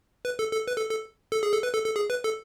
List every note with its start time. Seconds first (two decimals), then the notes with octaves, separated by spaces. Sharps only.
0.25 B4
0.39 A4
0.53 A4
0.68 B4
0.78 A4
0.89 A4
1.32 A4
1.43 G#4
1.52 A4
1.63 B4
1.73 A4
1.85 A4
1.96 G#4
2.10 B4
2.24 A4